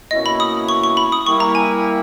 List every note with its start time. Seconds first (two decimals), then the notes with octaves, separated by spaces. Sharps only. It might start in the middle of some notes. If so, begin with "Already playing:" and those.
0.11 B2 A#3 C#4 E4 D#5
0.26 B5
0.40 D#6
0.69 C#6
0.83 C#6
0.97 B5
1.12 D#6
1.26 G3 A#3 E4 C#6
1.40 A#5
1.55 G#5